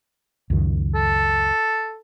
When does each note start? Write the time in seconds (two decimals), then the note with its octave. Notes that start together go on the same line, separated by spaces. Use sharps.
0.50 C#2 F#2 D#3
0.95 A4